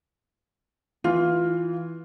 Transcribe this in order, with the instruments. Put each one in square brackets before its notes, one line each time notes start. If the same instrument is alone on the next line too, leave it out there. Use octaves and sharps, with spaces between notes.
[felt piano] E3 [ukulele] F4